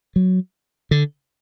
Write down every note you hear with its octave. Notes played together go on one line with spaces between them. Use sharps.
F#3
D3